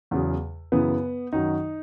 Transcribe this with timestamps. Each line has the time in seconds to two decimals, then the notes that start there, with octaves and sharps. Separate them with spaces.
0.11 E2 C#3 F#3
0.72 F#2 C#3 E3 B3
1.32 F#2 D#3 F#3 D#4